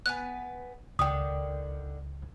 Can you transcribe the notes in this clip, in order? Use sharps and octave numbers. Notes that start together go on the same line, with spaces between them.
B3 B4 G#5 F#6
C#2 D3 D#3 G5 D#6